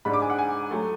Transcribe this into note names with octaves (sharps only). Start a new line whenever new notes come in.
G#2 G#3 D4 B5
D6
G#5
F#5
G#5
F#3 A3